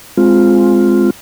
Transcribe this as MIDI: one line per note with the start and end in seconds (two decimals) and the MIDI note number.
0.17 1.10 56
0.17 1.10 60
0.17 1.10 65